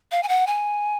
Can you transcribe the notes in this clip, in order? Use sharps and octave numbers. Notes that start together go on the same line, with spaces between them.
F5
G#5
F#5
G#5